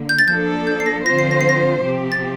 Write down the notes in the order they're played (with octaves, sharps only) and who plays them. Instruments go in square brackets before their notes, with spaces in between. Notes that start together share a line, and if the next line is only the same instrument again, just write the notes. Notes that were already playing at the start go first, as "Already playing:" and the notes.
Already playing: [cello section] D3 A#3
[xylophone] G6
A6
[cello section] F3 A#3 D4 A4 [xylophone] G6
[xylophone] G6
C7
A#6
[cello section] D3 F3 C4 F4 C5 [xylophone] A#6
[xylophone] C7
A#6
C7
A#6
[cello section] C3 F3 C4 G4
[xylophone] A6